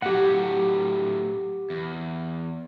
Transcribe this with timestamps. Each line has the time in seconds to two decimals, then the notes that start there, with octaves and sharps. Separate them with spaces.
0.02 A2 F#3 G4 F#5
1.70 E2